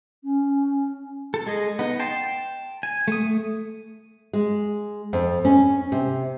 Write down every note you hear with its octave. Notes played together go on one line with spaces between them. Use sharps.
C#4
A4
G#3 G#4 D#5
B3 D#4
G5 A5 C6
G#5
A3 D#6
G#3
F2
C#4
C3